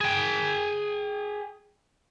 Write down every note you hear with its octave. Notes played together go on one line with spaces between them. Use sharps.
G#4 G5